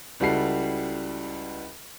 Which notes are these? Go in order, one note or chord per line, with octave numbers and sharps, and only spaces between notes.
C#2 G3 E4 F#4 A4 C7